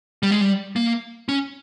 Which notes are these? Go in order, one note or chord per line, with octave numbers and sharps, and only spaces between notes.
G3
G#3
G3
A#3
C#4